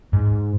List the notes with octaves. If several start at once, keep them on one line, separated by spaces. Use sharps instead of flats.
G#2